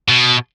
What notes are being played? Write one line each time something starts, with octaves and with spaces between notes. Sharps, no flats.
B2